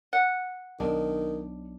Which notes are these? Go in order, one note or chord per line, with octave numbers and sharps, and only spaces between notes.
F#5
B1 D#3 D4